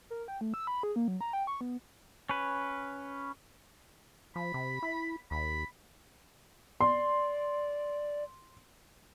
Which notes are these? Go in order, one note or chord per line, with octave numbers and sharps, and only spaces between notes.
A#4
G5
A3
E6
B5
G#4
A#3
F#3
A#5
G5
C#6
B3
C#4 B4
F3 B5
C3
E4
D#2 B5
D5 C6